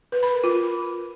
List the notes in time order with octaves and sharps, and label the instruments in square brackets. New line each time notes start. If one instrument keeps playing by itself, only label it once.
[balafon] B4
B5
A#4
F4